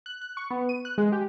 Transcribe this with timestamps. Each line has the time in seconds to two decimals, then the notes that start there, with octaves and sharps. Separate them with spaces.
0.06 F#6
0.22 F#6
0.37 C#6
0.51 B3
0.69 D#7
0.85 F#6
0.98 G#3
1.12 G4